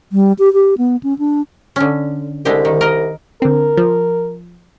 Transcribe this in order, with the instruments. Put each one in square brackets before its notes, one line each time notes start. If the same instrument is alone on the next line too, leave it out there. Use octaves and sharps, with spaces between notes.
[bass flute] G3
G4
G4
B3
C#4
D4
[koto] D3 C#4
[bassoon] C2 [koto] D3 G#3 G4
[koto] D#3
A#4 D#5
[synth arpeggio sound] D3 C4 [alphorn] A#4
[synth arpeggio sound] F3